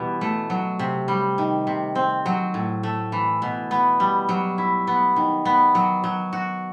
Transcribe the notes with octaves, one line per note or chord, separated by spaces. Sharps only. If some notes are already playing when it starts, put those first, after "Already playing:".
Already playing: B2 E3 G3
A3
F#3
C3
G3
D#3
C3
C4
F#3
A2
A3
E3
B2
B3
G3
F#3
E4
B3
D#3
B3
F#3
F#3
F#4